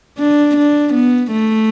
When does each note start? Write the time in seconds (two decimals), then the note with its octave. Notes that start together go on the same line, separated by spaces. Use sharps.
0.18 D4
0.57 D4
0.94 B3
1.31 A3